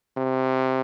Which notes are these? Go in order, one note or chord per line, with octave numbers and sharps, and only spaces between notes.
C3